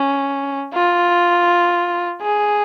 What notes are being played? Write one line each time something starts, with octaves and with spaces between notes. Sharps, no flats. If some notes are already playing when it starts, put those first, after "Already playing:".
Already playing: C#4
F4
G#4